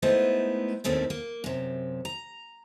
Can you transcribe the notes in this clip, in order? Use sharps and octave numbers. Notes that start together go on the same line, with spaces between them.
G#3 A3 B3 D#4 E4 C5
D#2 A2 D#3 A3 C4 C#4
A#3
F#2 C3
A#5